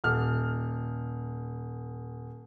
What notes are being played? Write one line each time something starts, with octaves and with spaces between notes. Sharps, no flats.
D#1 F6